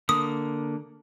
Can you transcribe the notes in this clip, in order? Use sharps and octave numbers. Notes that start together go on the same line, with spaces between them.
D3 A#3 D#6